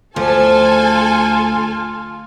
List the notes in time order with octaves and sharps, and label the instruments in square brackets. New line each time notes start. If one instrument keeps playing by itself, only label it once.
[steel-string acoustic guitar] D2 [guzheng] F3 [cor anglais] F4 [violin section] A4 G#5